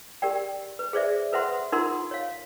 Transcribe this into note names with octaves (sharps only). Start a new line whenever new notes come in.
G4 A#4 D5 G5
B4
G#4 C5 D5 E5
A4 B4 C5 E5 F#5 C6
D#4 F4 A4 A#4 F#5 C6
C#5 F5